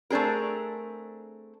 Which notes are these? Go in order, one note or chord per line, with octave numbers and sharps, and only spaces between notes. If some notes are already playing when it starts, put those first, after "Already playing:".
A3 C4 D4 G#4 A#4